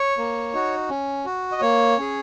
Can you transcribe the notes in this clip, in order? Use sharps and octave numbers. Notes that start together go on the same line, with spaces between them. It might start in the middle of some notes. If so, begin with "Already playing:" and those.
Already playing: C#5
A#3
D#4 F#4
C#4
F#4
D#5
A#3 C#5
C#4 G#4